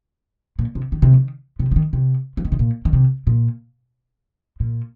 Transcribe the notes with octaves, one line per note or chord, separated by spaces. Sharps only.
A#2
C3
D#3
C3
D#3
C3
F3
D#3
C3
F3
D#3
C3
A#2
D#3
C3
A#2
A#2